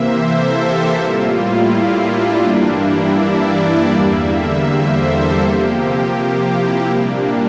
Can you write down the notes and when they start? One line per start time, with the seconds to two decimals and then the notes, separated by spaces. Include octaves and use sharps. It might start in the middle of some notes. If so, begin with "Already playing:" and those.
Already playing: C3 E3 A#3 C5 E5
0.21 A4
0.58 G4
0.94 A2 G3 A#3 F4
1.31 E4
2.06 D4
2.42 G2 E3 G3 A#3
2.79 E4
3.16 D5
3.90 E2 D3 G3 A#3 E5
4.65 C5
5.01 A4
5.39 C3 F3 A#3 G4
6.49 E4
6.86 A#2 G3 A#3 D4